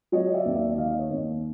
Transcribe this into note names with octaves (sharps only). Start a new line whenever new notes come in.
F#3 C#5 D#5
D5 E5
D#2
D5 E5
D#3 D#5 F5
C#5 D#5
D#2